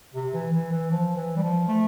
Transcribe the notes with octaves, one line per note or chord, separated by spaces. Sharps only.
C3
E3
E3
E3
F3
E3
G3
F3
A3